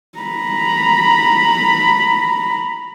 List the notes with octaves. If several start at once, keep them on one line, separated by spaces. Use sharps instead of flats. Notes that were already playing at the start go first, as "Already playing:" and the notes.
A#5 B5